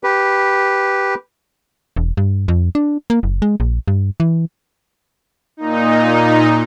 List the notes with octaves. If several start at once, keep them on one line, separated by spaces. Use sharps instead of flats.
G4 B4
E1
G2
F2
D4
A#3
F#1
G#3
A#1
G2
E3
A#2 D#4